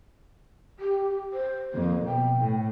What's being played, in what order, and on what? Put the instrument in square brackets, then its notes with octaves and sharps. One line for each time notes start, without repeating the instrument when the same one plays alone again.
[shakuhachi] G4
C5
[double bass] F2 [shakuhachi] A#3
[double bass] B2 [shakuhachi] G5
[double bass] A2